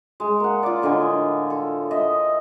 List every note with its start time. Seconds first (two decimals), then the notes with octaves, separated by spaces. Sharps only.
0.20 G#3
0.40 A#3 F#5
0.63 F4 D5
0.82 A2 D3 D#5 G#5
1.50 A4
1.91 D#5 E5